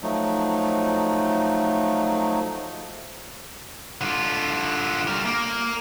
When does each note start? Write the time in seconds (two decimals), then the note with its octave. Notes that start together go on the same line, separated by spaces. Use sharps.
0.03 F3 F#3 A3 D#4
4.01 D3 F4
5.07 G3 A#4
5.25 A#3